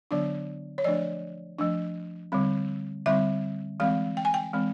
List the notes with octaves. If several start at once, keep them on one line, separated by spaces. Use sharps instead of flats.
D3 F#3 B3 D4 D5
C#5
F3 A3 D4 D5
F3 A3 D4
D3 G3 C4
D3 G3 C4 E5
E3 G#3 C4 F5
G5
G#5
G5
E3 G#3 C4